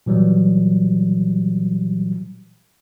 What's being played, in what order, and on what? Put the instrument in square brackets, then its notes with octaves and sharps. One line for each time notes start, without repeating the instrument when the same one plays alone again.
[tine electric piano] A#2 E3 F#3 G3